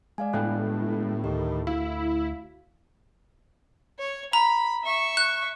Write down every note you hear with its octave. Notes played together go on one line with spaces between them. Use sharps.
G#3 D5 F5 G#5
G1 A2 A4 G5 F#6
D2 D#3 G4 A#4
A2 E4 F#4 F5
C#5
A#5 B5
E5 C#6
F#6